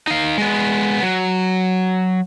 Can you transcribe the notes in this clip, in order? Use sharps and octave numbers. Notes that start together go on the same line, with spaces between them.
D#4 F5
G#3 B3
F#3